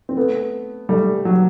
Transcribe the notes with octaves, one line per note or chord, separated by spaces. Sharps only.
C4
A3 B3
G3 A3
F#3